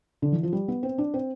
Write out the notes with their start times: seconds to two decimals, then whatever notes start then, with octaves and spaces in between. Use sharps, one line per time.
0.22 D3
0.32 E3
0.43 F3
0.53 G3
0.68 B3
0.83 C4
0.98 D4
1.14 C4